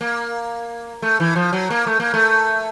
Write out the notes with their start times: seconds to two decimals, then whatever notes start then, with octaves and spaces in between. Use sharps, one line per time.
0.01 A#3
1.02 A3
1.20 E3
1.36 F3
1.53 F#3
1.70 A#3
1.87 A3
2.00 A#3
2.14 A3